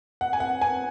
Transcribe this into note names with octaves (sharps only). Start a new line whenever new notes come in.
F#5
G#5
F#5
G#5